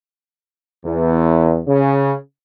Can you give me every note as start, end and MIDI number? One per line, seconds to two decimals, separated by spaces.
0.85 1.59 40
1.67 2.13 49